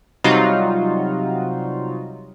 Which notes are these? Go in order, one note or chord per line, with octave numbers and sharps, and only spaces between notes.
C3 F#3 G3 D#4 F4 F#4